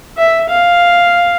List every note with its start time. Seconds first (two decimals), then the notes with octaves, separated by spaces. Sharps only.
0.17 E5
0.49 F5